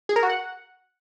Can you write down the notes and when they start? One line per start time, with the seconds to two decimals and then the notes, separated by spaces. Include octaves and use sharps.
0.09 G#4
0.16 A#4
0.23 F#4
0.29 F#5